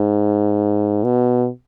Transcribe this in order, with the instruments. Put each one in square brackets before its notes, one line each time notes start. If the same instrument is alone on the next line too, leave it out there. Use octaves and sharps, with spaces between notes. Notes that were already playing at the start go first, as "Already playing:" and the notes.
Already playing: [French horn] G#2
B2